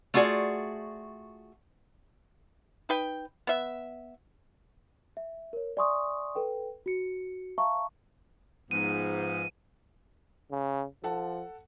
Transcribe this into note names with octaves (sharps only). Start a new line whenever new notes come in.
A3 F4 F#4 G#4 D5
D#4 B4 G5
B3 E5
E5
A#4 C#5
D5 E5 G#5 C6 C#6 D#6
A4 B4 G5
F#4 C#7
E5 F5 A5 A#5 C#6
G#2 F3 B3 D#7
C#3
F3 A4 F#5 A5